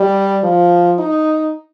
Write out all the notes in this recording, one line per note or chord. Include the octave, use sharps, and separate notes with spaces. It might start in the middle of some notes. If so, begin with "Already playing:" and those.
Already playing: G3
F3
D#4